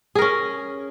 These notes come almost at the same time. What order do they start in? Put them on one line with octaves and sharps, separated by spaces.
G#4 A#4 C#4